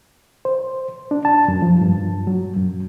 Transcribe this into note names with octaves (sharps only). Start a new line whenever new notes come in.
C5
D4
A5
F#2
F3
G2
F#3
F#2